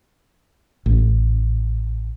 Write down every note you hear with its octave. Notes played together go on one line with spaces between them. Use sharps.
A1